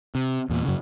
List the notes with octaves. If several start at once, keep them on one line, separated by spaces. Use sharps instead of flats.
C3
E2 A#2
F#2 C#3